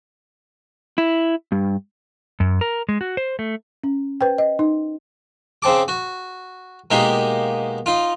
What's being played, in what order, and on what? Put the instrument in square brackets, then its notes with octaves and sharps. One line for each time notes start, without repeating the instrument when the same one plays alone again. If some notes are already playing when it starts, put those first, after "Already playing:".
[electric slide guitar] E4
G2
F#2
A#4
G#3
F#4
C5
A3
[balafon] C#4
B4 C5 G5
D#5
D#4
[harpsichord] C#3 C4 A5 D6
F#4
B2 G#3 A#3 D#4 G4
D#4 F4